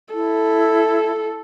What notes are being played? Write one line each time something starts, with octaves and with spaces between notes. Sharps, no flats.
E4 A4